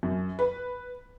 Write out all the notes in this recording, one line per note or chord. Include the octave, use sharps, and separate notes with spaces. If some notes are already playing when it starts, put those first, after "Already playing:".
F#2
B4